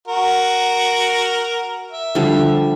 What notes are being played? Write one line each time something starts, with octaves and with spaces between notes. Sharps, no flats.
F#4 A#4
E5
D3 F3 G3